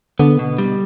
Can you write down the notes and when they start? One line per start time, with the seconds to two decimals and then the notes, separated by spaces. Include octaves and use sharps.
0.19 D3 B3
0.39 B2
0.58 G3